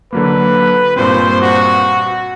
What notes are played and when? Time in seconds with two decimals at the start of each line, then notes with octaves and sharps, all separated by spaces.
0.13 D3 F#3 A#3 B4
0.96 G2 A#2 C4 C5
1.41 F#4